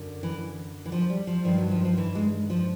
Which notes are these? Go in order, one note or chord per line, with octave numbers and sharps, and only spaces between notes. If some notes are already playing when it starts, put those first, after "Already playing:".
Already playing: F#2 D3
E3
E3
F3
G3
F3
G2 D#3 F3
F#3
F3
F3
E3
G#3
F3